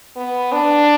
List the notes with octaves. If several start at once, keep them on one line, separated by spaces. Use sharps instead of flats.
B3
D4